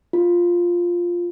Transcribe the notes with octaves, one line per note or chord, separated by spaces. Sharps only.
F4